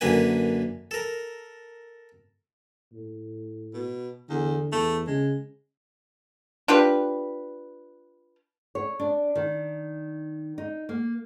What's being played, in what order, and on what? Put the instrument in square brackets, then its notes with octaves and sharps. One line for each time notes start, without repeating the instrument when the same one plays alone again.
[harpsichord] F#2 D3 A#3 B4 G#5
A4 A#4
[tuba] A2
[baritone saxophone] B2
[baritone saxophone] E2 [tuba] D3
[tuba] E2 [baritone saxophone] A3
[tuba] C#3 [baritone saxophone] G#3
[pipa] D4 F4 G4 B4
[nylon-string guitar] C#5
D4
D#3
D#4
A#3